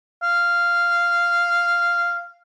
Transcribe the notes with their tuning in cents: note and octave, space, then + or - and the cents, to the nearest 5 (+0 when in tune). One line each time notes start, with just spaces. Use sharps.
F5 -10